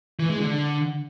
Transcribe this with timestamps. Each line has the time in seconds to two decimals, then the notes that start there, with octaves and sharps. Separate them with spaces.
0.20 E3
0.30 G#3
0.40 D3